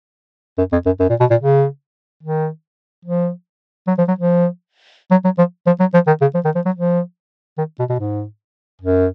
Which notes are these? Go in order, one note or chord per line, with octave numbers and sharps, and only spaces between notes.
F#2
F2
F#2
F#2
A#2
B2
A#2
C#3
D#3
F3
F#3
F3
F#3
F3
F#3
F#3
F3
F3
F#3
F3
D#3
C#3
F3
D#3
F3
F#3
F3
D#3
B2
B2
G#2
F#2